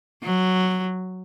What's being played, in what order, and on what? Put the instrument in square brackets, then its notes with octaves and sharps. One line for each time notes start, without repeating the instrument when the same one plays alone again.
[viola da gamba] F#3